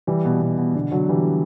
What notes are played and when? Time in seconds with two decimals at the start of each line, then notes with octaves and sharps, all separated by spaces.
0.07 E3 G3
0.25 B2
0.41 B2
0.58 B2
0.74 B2 D3
0.91 D3 F#3
1.09 E3 G3